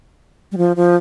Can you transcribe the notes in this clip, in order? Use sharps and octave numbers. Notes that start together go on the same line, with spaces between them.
G3
F3
F3